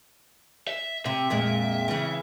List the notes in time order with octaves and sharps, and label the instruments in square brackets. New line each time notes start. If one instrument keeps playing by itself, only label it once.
[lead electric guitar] E5
[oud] C3 [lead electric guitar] E5
[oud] F2 A#2 G#3
C#3 E3